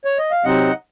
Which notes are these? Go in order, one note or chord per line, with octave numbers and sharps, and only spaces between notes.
C#5
D#5
F5
C3 F#3 C4 D#4 D#5 F#5